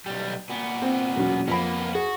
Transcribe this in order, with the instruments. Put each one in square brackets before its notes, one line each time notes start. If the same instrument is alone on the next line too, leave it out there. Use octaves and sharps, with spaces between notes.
[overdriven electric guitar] B1 G3
A#2 B3
[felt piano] C4
E1 F#3 C#4
[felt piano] F2 B5 [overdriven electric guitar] A#3 B3
[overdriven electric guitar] F#4 [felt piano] G#4